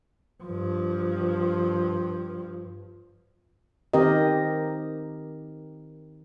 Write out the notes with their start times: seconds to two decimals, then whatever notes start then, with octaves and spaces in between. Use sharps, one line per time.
0.43 G2 F3
3.93 D#3 C4 G4 A#4 D#5